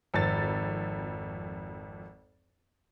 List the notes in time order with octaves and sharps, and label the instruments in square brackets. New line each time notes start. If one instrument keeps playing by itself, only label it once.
[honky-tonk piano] G#1 F2 A6